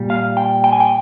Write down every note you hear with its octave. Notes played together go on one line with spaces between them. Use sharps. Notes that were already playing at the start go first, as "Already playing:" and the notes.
Already playing: A#2 G3
F5
G5
G5
G#5
G5